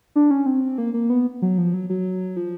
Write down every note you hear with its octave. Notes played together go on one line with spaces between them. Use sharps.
D4
C#4
C4
A#3
A#3
B3
F#3
F3
F#3
F#3
F3